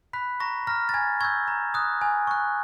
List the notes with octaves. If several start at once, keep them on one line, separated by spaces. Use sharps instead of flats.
B5 F#6 B6
A#5 C#6 A#6
A#5 F6 A#6
A6
G#5 G#6
C#6 E6 G6 G#6
A#5
D#6 F#6
G#5
C#6 F#6